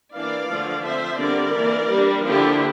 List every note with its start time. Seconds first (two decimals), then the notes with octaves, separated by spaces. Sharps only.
0.13 E3 A#3 D4 D5 F5
0.48 D3 F3 A3
0.84 F3 C4 C5 E5
1.19 D3 G3 C4 A#4 D5
1.55 E3 A#3 D4
1.91 G3 D4
2.26 D3 F3 A#3 D4 E4 G4